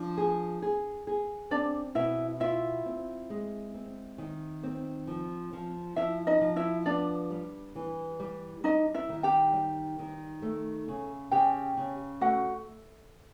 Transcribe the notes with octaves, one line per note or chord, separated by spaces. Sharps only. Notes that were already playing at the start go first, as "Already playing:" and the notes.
Already playing: F3 D4
G#4
G#4
G#4
C4 D4 D5
B2 E4 E5
E4 F4 E5
C4
G#3
C4
D#3
C4
F3
F3
F3 E4 E5
D#4 D#5
F3
E4 E5
B3 D4 D5
G3
E3
G3
G3 D#4 D#5
E4 E5
D#3
G4 G5
G3
D#3
A3
C#3
C#3 G4 G5
C#3
A3 F#4 F#5